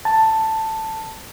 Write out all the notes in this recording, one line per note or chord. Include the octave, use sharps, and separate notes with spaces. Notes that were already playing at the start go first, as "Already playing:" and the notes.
A5